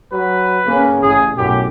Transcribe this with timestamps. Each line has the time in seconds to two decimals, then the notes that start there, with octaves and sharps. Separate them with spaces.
0.12 F#3 B4
0.66 C#3 A#3 C#4
1.02 A1 G#4
1.38 B1 F#2 A2 G4